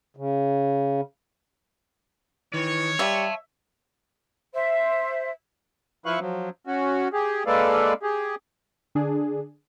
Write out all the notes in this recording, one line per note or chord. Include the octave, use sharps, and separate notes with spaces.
C#3
D#3 E3 C#5
G3 E5 F5 A5
C5 E5
F3 E4 B4 F5 C#6 F#6
F3 F#3
C#4 F#4
G4 G#4
G#3 A#3 A4 B4 D5 F5
G4 G#4
D3 D4 G#4